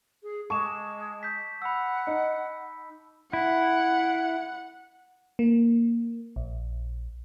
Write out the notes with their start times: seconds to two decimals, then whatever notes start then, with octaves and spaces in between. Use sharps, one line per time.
0.23 G#4
0.50 G#3 A5 C#6 D6 E7
1.23 G6 B6
1.62 F#5 B5 E6
2.07 D#4
3.33 E4 F#5
5.39 A#3
6.36 A#1